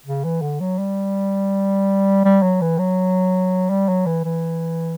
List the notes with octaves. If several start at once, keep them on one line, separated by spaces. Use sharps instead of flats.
C#3
E3
D3
F#3
G3
G3
F#3
E3
F#3
G3
F#3
E3
E3